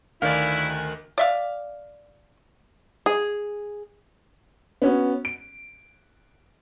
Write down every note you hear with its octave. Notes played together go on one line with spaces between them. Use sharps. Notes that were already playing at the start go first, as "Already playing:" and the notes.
D2 D#3 E4 D5 F5 G#5 F#6
D5 E5 F5
G#4
B3 C#4 F#4
D7